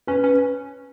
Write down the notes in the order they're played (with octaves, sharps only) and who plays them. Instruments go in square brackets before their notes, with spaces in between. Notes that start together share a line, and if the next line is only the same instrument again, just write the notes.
[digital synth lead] C#4 [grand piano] B4
[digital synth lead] C#4